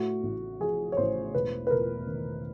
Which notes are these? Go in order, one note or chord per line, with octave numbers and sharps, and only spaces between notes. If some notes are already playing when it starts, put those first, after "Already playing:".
Already playing: A2 F#4
A1
F3 G#4
C#5
A1 C5
E1 B4
B4
E1 A#4
D#3